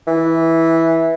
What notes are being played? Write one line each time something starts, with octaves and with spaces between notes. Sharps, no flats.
E3